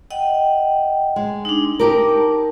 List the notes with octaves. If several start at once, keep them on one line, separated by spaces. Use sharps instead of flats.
D#5 F#5 G5
G#3
D4 D#4
D#4 G4 A#4 A5 D6